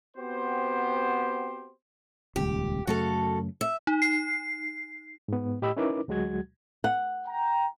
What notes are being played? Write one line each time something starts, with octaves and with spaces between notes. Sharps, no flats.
B3 C4 F#4 G4 C5
D#1 C#2 G4
F#2 C#3 A3 F#4 A4 F5
E5
D#4
C7
G#2 B3
A2 G4 D#5 B5 E6
C#4 D#4 E4 A#4 B4 D6
D2 F#3 G#3 F#4 G#6
F#5
G5 A#5